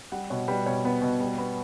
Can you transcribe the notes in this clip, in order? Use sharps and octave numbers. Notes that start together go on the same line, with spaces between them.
G3 F#5
B2 C#5
G3 B4
B2 C#5
B3
B2
G3
B3